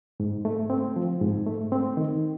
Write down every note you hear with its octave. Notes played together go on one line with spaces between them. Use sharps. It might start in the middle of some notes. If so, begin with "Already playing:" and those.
G#2
A3
C4
F3
G#2
A3
C4
D#3